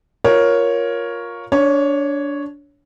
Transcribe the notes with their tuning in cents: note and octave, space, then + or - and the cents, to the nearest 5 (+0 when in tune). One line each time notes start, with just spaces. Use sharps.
F4 +15 A#4 +10 C#5 +0
D4 -20 C#5 +0